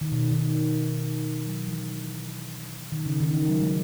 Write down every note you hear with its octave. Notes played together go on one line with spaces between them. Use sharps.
D#3
B2
D#3
F#3
E3
D#3
C#3
D#3
E3
F#3
G#3